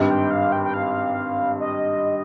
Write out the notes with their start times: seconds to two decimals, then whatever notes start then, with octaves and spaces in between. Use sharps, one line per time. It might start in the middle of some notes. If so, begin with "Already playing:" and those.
Already playing: G#1 G2 G3
0.09 G5
0.31 F5
0.52 G5
0.64 G5
0.74 F5
1.60 D#5